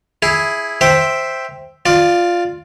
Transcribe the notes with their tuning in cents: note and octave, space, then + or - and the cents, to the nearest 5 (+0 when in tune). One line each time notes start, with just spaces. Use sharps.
E4 +0 G#4 +0
C5 +0 E5 +0 G5 +0
F4 +0 D5 +15